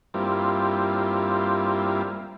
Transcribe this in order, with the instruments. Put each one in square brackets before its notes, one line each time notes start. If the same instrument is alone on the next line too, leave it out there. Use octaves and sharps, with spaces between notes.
[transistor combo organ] G2 G3 A#3 C4 E4 F4